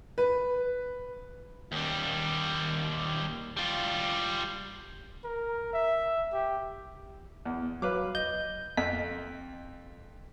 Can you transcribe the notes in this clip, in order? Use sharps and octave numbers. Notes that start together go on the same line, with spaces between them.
B4
D#2 G3
G3 F4
A#4
E5
G4
E2
F#3 B4 F5 D6
D#5 G6
F2 B6